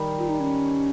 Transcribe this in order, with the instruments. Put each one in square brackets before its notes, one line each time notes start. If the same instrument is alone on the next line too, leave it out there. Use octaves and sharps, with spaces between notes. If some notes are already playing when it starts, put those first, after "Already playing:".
Already playing: [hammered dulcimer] D#3 G3
[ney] F4
D#4
C#4